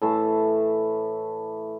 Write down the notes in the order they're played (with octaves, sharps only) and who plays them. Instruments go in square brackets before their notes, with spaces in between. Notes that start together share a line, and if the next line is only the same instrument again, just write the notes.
[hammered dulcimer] A2 E3 A3 A5